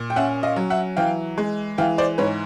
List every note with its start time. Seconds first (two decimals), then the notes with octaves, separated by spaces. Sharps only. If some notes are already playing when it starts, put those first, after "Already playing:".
Already playing: A#2
0.10 G5
0.16 C#4 E5 F#5
0.43 D#5 F5
0.56 F#3
0.70 E5 F#5
0.97 E3 F5 G5
1.38 G#3
1.78 E3 F5 G5
1.98 C5 D5
2.18 G#2 B4 C#5